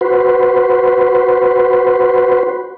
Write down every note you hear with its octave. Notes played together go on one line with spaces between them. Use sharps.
F#4 B4 C5